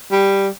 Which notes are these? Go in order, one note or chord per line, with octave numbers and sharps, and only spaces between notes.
G3